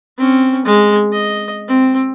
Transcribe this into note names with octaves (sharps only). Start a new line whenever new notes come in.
C4 C#4
G#3
D#5
C4